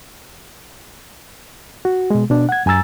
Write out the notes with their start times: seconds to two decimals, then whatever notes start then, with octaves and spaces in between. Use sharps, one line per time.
1.85 F#4
2.10 B2 G#3
2.30 B2 D4
2.49 F#5 G#6
2.66 F#2 G#5 A#5 E6 A6